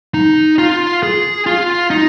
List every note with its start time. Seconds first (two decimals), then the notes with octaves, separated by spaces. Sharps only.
0.14 D#4
0.59 F4
1.03 G#4
1.46 F4
1.90 D#4